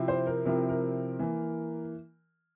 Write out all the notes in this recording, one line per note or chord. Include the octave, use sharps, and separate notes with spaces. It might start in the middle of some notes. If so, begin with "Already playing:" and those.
Already playing: C3 F3 C4 E4
C5
A#4
C3 F3 C4 E4 A#4
A#4
E3 A#3